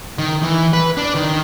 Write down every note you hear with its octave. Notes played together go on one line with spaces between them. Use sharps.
D#3
E3
B4
D4
D#3